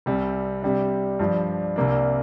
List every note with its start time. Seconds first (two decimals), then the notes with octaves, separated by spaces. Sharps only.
0.06 C2 C3 G3
0.62 C3 G3 D4
1.19 G2 F3 D4
1.76 C2 C3 A#3 D4